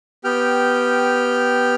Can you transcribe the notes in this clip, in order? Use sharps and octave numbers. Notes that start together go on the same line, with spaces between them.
B3 G4 G5 F6